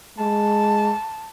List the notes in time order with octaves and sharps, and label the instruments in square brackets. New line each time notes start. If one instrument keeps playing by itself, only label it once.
[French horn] G#3 [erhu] A5